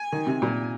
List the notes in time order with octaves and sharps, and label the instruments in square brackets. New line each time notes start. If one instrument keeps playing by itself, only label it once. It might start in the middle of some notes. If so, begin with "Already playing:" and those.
Already playing: [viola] G#5
[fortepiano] D#3
C3
A#2